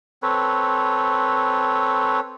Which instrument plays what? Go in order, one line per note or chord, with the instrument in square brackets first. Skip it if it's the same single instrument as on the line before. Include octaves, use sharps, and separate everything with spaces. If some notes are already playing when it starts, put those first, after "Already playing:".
[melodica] C4 A4 B4 C#5